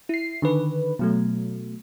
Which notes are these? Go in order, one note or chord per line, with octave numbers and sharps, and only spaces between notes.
E4 C7
D3 D#3 B4
B2 F#3 A3